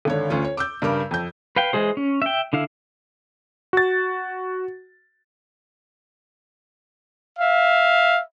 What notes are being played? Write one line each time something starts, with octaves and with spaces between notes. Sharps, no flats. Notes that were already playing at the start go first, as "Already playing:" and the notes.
G#1 D3 C#5
D2 C#4 F4
C#5
D6 E6 G6
G2 C#3 A#4 D6
F2 G6
B4 F5 G5
E3 G#3 G#4 C5
C#4
E5 G5
D3 E4 F5
F#4 A6
E5 F5